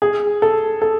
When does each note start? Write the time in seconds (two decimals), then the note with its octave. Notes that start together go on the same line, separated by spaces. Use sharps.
0.02 G#4
0.42 A4
0.82 A4